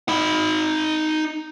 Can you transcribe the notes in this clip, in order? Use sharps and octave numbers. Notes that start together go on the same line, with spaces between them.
D#4 B5